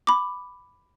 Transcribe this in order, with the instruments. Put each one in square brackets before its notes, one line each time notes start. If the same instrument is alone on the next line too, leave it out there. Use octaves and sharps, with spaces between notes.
[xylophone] B5 D6